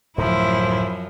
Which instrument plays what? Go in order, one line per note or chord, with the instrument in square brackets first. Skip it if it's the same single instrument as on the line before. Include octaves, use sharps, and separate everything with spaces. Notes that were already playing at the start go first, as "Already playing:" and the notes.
[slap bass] D1 A2 A3 [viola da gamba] F#2 F3 [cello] E4 [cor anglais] C5